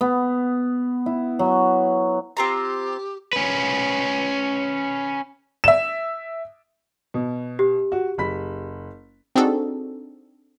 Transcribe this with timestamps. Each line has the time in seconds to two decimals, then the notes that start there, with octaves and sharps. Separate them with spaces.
0.01 B3
1.06 E4
1.39 F#3
2.37 C4 F4 G4 A#5
3.33 C#4 B4
5.64 E5 E7
7.14 B2
7.59 G4
7.92 F#4
8.18 F#1 B5 B6
9.36 C4 D4 D#4 F#4 G#4 A4